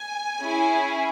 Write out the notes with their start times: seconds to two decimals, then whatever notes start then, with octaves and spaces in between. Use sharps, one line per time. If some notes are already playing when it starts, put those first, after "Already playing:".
Already playing: G#5
0.40 C#4 E4 G#4